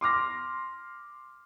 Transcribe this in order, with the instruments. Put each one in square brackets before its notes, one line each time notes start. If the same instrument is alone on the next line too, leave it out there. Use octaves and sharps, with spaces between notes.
[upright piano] C6 D6 F6 A#6